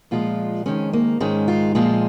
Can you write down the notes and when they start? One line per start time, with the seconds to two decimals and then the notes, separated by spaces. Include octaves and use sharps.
0.11 A#2 F3 G#3 F4
0.66 F2 D#3 G#3 C#4
0.93 A#3
1.20 G#2 D#3 G#3 C#4
1.48 F4
1.75 A#2 F3 G#3 F4